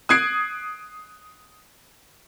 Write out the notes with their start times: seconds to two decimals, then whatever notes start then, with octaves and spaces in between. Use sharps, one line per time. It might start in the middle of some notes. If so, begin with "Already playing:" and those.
0.09 D#6 F#6 G#6 C7 D7